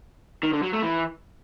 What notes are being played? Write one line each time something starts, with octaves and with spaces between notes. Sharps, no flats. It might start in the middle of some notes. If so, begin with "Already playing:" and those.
D#3
D3
F#3
A3
E3